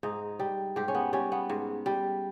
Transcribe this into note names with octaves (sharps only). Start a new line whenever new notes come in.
G#2 D#4
G3
G#2 G4
C#4
B3
G3 C#4
B3
G#2
G3